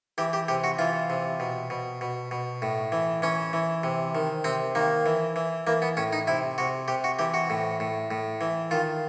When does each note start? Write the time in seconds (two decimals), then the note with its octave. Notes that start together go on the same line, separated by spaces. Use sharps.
0.18 E3 G4
0.33 G4
0.48 C3 G4
0.64 F#4
0.79 E3 F4
1.10 C3
1.40 B2
1.70 B2
2.01 B2
2.31 B2
2.62 A2
2.92 E3
3.22 E3 C#4
3.53 E3
3.83 C3
4.15 D#3
4.44 C3 C4
4.75 D#3 A#3
5.06 E3
5.36 E3
5.67 E3 A#3
5.82 B3
5.97 A2 C#4
6.12 D#4
6.27 C3 E4
6.58 C3 F#4
6.88 C3 G4
7.04 F#4
7.19 E3 G4
7.34 F#4
7.50 A2
7.80 A2
8.11 A2
8.41 E3
8.71 D#3 F4